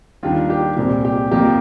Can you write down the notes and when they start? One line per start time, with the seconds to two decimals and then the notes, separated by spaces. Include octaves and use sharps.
0.23 D#2 D#3 G3 D4 F4
0.50 G4
0.77 C2 A#2 G#3 C4 G4
1.05 G4
1.32 F2 C3 F3 A#3 G4